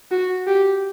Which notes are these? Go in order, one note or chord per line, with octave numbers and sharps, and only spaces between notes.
F#4
G4